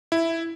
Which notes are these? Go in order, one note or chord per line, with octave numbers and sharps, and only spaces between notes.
E4